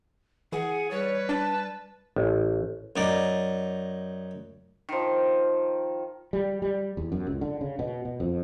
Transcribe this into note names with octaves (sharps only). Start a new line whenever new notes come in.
E3 G#4 F#5
G3 B4 C#5
D4 A5
A1
F#2 D#4 D5
D#3 F3
G3
G3
E2
F#2
C#2
D3
C#3
B2
B2
F2